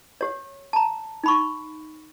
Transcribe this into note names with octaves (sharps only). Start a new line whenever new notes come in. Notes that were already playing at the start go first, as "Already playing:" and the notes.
G4 C#5
A5 A#5
D#4 B5 C#6